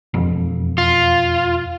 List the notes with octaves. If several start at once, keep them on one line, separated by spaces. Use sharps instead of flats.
E1 F2
F4